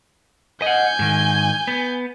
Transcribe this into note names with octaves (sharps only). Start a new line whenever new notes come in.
D#5 F#5 G#5 G6
G#2 D#3
B3